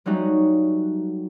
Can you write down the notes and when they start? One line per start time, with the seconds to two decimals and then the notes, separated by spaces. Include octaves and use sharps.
0.06 F#3 G3 A3 C#4 D#4 F#4